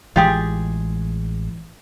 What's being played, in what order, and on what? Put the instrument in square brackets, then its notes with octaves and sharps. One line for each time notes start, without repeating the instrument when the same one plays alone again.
[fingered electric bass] A1 E3 G#3 [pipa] F4 G4 G#4